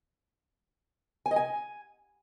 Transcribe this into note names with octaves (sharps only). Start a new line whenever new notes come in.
G#5
D#5
G#5